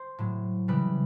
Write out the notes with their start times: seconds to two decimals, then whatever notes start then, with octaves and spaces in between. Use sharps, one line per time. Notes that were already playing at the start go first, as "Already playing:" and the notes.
Already playing: C5
0.19 A2 F#3
0.68 C#3 E3 G3 B4